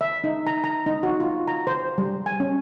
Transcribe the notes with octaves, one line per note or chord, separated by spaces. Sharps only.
E5
D#4
A#5
A#5
D#4
F#4
F4
A#5
C5
G3
G#5
C#4